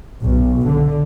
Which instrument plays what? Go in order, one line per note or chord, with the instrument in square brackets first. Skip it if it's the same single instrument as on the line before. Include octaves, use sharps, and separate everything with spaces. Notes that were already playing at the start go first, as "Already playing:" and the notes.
[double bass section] B1
D3